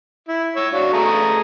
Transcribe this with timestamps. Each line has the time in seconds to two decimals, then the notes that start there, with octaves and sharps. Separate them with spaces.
0.29 E4
0.56 C#5 E5
0.73 D4 F#4 F5
0.93 A3 G#4 A#5